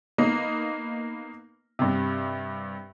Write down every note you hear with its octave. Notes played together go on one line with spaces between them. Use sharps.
A#3 B3 D#4 D#5
G2 C3